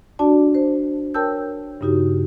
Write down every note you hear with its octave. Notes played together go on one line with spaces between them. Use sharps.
D4 F#4 D5 A5
C5
A#4 C#5 G5 A5 E6 G6
G2 C#3 D#4 F#4 G4